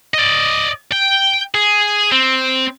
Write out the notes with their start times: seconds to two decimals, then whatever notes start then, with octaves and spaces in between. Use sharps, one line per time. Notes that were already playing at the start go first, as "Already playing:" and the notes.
0.14 D5 D#5
0.92 G5
1.54 G#4
2.12 C4